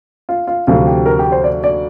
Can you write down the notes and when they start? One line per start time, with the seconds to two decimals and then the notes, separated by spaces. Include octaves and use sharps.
0.29 F4
0.47 F4
0.67 D2 C3 F3 F4
0.87 G4
1.06 A#4
1.19 G4
1.32 C5
1.44 D5
1.64 D5